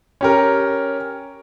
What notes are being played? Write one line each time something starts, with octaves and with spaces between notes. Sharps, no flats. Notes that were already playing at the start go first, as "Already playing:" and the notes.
C#4 G4 A#4